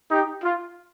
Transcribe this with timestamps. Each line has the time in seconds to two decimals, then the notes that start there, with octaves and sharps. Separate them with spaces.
0.11 D#4 G4
0.44 F4